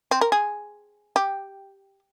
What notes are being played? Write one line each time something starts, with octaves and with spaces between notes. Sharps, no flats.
C4
A#4
G#4
G4